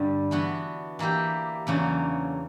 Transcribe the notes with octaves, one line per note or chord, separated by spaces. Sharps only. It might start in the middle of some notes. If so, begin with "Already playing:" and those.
Already playing: G2 D3 G3
E3 B3 D4 F#4
E3 A#3 E4 G4
E2 C#3 F#3 A#3 D4